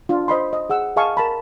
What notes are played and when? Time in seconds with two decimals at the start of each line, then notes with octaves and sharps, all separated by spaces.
0.09 D4 F4
0.28 C5 D#5 B5 C6
0.53 D#5
0.70 G#4 F#5 E6
0.96 G#4 D#5 F5 G#5 A5 C#6
1.17 A#4 A5 B5